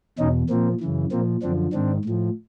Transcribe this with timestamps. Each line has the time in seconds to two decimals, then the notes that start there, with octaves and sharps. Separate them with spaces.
0.19 E2 B2 C#4 D#4
0.50 A#2 F3 A#3 C4
0.80 F#2 C#3 E3
1.11 A#2 F3 A#3 C4
1.42 F#2 D3 F3 C4 D4
1.73 G#2 D#3 C4 D4
2.05 A2 F3